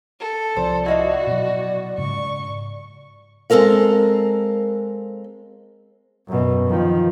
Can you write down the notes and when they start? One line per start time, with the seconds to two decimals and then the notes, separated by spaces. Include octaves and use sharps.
0.20 A4
0.56 C2 C3 F3 C5 D5
0.86 E4 F#4 D#5 F5
1.27 B2 F#3
1.98 G#2 C#3 C#6
3.50 G#3 C4 A4 A#4 F5
6.27 F#2 B2
6.67 D#3 F3